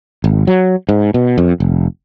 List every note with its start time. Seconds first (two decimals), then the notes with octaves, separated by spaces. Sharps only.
0.24 G#1
0.47 F#3
0.89 G#2
1.14 B2
1.38 F2
1.60 F1